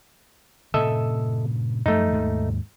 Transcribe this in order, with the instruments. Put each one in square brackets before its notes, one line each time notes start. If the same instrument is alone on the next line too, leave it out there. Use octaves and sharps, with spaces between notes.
[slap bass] G2 A#2 C#3 [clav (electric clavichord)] A4 D#5 E5
[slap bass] F#2 F3 G3 [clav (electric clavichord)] A3 D#4
[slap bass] D#2 G#2